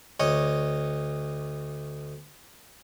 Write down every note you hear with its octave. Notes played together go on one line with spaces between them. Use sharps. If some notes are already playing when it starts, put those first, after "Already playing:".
D2 C#5 D#5